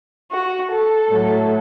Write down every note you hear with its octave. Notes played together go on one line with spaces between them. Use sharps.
F#4
A4
A2 F#3 A3